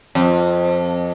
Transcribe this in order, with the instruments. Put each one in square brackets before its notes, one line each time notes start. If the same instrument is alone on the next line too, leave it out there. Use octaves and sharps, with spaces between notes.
[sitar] F2